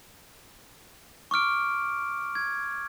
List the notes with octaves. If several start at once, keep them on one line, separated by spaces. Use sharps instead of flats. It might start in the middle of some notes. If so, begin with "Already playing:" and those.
C#6 D6 F6 D7
G#6